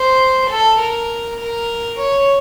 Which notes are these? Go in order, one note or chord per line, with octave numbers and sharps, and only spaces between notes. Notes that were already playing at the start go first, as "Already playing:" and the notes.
Already playing: C5
A4
A#4
A#4
C#5